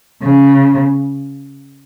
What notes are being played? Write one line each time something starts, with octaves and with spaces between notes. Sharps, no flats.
C#3